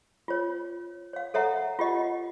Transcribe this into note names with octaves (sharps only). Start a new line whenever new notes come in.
F4 C#5
C#5 F5
A4 C#5 E5 F#5 A#5
F4 G4 D#5 F#5